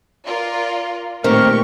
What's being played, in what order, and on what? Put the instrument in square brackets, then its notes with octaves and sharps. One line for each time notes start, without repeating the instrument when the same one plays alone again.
[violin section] F4 A#4 D5
[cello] A#2 A3 [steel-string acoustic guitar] D#3 C4 [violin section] G4 C#6 [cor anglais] A#4